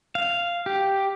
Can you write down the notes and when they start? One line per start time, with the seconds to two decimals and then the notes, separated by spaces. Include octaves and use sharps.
0.15 F5
0.66 G4